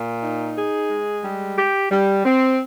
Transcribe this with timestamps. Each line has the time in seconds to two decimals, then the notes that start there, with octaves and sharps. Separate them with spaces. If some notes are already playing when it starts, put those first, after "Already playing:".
Already playing: A#2
0.22 D#4
0.55 G#4
0.90 G#3
1.23 G3
1.57 G4
1.91 G3
2.25 C4